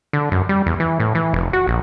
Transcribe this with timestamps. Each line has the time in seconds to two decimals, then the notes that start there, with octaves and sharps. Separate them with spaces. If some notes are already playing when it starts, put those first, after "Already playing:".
0.13 D3
0.32 F#2
0.49 G3
0.66 E2
0.80 E3
1.00 A2
1.15 E3
1.34 F1
1.53 F#4
1.67 A#1